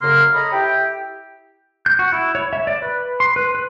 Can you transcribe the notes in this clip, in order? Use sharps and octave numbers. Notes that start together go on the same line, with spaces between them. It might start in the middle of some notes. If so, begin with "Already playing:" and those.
F#2 C#3 A#3 C6 F6
A4 C#5 D#5 A#5 B5
E4 G4 G5
G6
F#4
E4
C#5
E5
D5
B4
C6
B4
B4